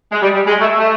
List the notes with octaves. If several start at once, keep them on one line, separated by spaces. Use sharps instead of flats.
G#3
G3
G3
G#3
A3
A3